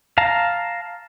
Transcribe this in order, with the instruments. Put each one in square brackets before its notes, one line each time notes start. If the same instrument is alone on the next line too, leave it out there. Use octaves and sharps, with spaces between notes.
[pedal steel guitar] F5 A5 A#5